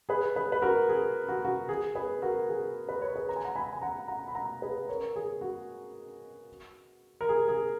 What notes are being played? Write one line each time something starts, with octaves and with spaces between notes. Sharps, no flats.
G#4 B4
G#4 B4
B4
F#4 A#4
G#4
F#4
F#4
G#4
G#4 B4
F#4 A#4
G#4
B4
C#5
G#4 B4
A#5
G#5
F#5 A#5
G#5 B5
G#5
F#5 A#5
F#5 A#5
B5
F#5 A#5
G#4 B4
A#4 C#5
G#4
F#4
A#4
G#4
G#4